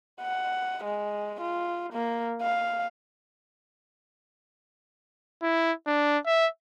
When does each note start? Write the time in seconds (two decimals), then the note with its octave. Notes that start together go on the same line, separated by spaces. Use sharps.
0.21 F#5
0.84 G#3
1.41 F4
1.93 A#3
2.42 F5
5.43 E4
5.87 D4
6.26 E5